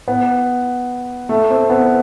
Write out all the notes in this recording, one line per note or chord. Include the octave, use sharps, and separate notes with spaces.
B3
A3
C4
C4
B3